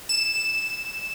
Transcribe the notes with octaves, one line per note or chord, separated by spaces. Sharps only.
E7